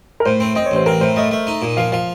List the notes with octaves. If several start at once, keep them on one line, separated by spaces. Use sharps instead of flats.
A#4
A2 C5
C4
C4 D#5
C#5
A1 C5
C4 A#4
A2 C5
A3 D#5
A3
D#4
A#2
F3 F5
F3 F5